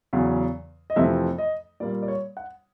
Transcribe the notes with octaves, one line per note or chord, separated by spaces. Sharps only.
E2 C#3 F#3
D#5
F2 C3 E3 A3 C4 E5
D#5
A#2 G3 A#3 D5
D5
C#5
F#5